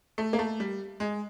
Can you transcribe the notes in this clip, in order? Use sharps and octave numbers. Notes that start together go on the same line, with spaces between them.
A3
A#3
A3
G3
G#3